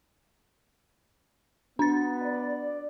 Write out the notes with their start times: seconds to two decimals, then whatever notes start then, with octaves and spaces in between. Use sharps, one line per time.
1.79 B3 D4 A6
2.23 D5